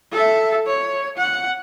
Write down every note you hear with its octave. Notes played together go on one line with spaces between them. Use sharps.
A4 E5
C#5
F#5